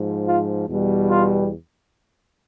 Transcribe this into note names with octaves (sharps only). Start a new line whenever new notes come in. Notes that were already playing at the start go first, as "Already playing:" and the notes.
Already playing: G#2 F3
F4
E2 B2 G3
F4